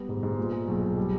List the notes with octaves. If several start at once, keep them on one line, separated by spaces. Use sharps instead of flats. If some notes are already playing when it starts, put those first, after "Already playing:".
Already playing: G3 B3
G#2
G#2
A#2
G#3
B1
B1
G3